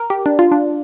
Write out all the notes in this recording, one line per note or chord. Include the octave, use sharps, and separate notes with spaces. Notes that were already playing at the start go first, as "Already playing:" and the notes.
Already playing: A#4
G4
D4
F4
D4